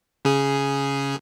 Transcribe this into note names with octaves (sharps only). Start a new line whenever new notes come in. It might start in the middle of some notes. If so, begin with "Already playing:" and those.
C#3 G#4